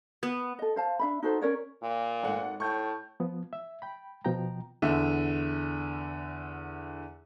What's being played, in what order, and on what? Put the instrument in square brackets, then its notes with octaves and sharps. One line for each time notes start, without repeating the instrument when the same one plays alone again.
[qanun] B3
[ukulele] A4 D#5
C5 F5 A5
D4 E5 B5
D#4 F#4 A4 C5
C#4 A#4 C#5 D5
[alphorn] A#2
[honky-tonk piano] G#1 A3 F#5
[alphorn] A2 [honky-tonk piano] C#6 G6
[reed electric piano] F3 B3
E5
G5 B5
B2 F3 G5 A#5
[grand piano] E2 D3 E5